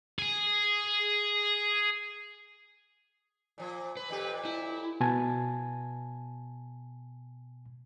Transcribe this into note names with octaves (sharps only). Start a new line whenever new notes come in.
G#4 G#5
A#2 F3
B4
F2 A#2 G4
E4
B2 G#5 A5